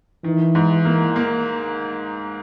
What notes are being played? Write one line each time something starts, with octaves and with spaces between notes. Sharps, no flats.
D#3 E3
G#2
A#3
A#3